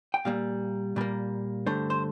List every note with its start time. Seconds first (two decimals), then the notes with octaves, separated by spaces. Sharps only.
0.14 G5
0.25 A#2 G3 A#3 F5
0.96 A#2 G3 A#3
1.67 G2 D3 A3 C5
1.90 C5